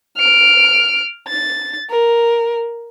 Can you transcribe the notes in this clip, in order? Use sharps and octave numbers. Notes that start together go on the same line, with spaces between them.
F6 D7
A6
A#4